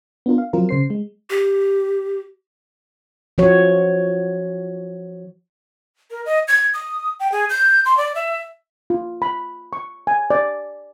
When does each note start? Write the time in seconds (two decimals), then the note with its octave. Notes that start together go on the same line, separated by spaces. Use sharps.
0.26 B3 D4 F4 A#4
0.38 F5
0.53 F3 F#3 C4 F4 A#4
0.69 C#3 C5 C7
0.90 G#3
1.30 G4
3.38 F3 F#4 C#5
6.11 A#4
6.26 D#5
6.48 G#6
6.74 D#6
7.20 G5
7.32 G#4
7.50 G6
7.85 C6
7.97 D5
8.15 E5
8.90 F4
9.22 B5
9.73 C#6
10.07 G#5
10.30 D5